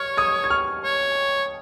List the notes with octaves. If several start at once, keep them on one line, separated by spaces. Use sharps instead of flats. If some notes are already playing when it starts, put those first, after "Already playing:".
Already playing: C#5 C#6 F6
D#6 G#6
G#6
C#6 F6
C#5